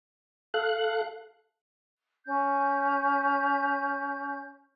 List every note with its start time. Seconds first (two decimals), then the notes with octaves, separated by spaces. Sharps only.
0.54 A4 F5 F#6
2.24 C#4 G6